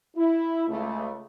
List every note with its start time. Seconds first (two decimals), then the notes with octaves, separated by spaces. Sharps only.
0.16 E4
0.68 C#2 A3